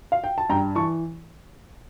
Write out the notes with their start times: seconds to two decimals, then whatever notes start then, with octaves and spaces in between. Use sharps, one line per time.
0.12 F5
0.24 G5
0.38 A5
0.49 G2 G5 A#5
0.75 E3 A5 C#6